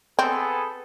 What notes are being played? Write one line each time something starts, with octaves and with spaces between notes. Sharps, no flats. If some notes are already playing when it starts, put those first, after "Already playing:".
B3 C4 G#4 A4